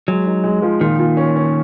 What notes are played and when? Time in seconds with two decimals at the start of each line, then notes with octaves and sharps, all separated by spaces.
0.08 F#3 G#3
0.26 D#4
0.44 G#3
0.62 F3
0.81 A#2 D#3
0.99 A#2
1.17 C#4
1.36 C#4